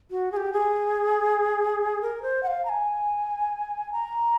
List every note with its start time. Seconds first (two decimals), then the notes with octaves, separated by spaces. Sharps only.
0.11 F#4
0.32 G#4
0.37 G4
0.53 G#4
2.02 A#4
2.22 C5
2.43 F#5
2.47 F5
2.65 A#5
2.69 G#5
3.92 A#5